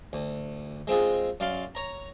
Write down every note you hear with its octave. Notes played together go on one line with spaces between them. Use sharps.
D2
G#3 C4 F4 G#4
F#2 D5 F5 C6
C#5 A#5